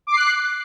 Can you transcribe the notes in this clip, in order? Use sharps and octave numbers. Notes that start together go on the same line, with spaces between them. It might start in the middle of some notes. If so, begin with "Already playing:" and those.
D6 F#6 C7